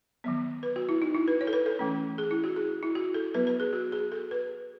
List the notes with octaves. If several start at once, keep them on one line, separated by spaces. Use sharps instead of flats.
D#3 F#3 B3
B4
F#4
E4
D#4
E4
B4
C#5
A4
B4
A4
E3 A3 C#4
G#4
E4
F#4
G#4
E4
F#4
A4
F#3 B3 B4
B4
G#4
F#4
G#4
A4
B4